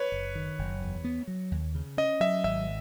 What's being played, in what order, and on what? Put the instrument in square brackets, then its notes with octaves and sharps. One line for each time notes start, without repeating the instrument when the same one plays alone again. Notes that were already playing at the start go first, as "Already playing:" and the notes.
Already playing: [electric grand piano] B4 C#5
[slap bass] F#1
D#3
F#1
E2
B3
F#3
D#2
C#3
[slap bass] C#4 [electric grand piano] D#5
[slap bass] F#3 [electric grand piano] E5
[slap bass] G#1 [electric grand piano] E5